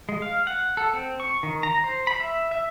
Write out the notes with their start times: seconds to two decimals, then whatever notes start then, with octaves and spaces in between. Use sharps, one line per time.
0.09 G#3
0.22 F5
0.47 F#5
0.77 A4
0.94 C4
1.20 C#6
1.43 D#3
1.63 A#5
1.84 C5
2.07 B5
2.20 E5
2.51 E5